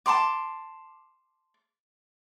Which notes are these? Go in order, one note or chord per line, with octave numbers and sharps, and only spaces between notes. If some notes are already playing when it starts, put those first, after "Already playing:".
A5 A#5 C6 D6